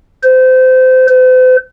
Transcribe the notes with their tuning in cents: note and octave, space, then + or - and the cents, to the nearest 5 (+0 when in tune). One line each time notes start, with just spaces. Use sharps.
C5 -25
C5 -45